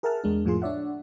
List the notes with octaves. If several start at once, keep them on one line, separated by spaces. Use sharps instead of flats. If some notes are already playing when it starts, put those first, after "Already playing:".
G#4 A#4 E5 F#5 A5 F6
E2 G#3 D4
F2 A2 F3 F4 G#4 C6
D4 C#5 D5 E5 F#5